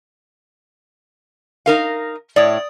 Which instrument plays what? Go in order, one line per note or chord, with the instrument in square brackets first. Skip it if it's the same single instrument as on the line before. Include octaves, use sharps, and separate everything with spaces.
[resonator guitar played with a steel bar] D#4 A#4 F5
[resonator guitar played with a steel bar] A2 C#5 [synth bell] D5 D#6